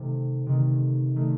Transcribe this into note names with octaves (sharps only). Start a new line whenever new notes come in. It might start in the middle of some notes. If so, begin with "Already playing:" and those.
Already playing: C3 D#3 A3
C3 D#3 A3
D#3 A3